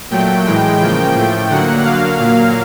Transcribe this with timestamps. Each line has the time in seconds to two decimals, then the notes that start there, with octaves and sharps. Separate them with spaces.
0.10 A#2 F#3 A3 G5
0.45 A2 E3 G#3 G5
0.80 C#3 F3 A#3 G5
1.15 A2 F3 A3
1.50 D3 F#3 A#3 F#5
1.84 D3 F#3 A#3 F5
2.19 A#2 F#3 A#3 F5